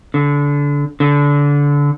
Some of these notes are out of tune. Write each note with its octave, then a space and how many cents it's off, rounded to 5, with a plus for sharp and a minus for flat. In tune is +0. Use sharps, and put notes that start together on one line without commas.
D3 -25
D3 -25